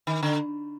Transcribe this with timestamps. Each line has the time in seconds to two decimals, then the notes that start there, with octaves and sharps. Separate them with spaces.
0.07 D#3
0.23 D3